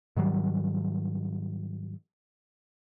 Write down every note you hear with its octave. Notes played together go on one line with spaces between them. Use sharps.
G#2 D#3 F#3 G3